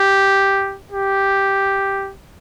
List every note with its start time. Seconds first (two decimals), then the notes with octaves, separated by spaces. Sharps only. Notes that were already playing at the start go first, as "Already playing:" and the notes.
Already playing: G4
0.92 G4